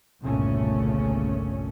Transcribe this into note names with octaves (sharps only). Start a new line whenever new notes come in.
G1 C2 A#2 C#3 A3 C#4